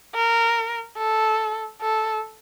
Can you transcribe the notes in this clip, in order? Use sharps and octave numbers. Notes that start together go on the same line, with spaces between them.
A#4
A4
A4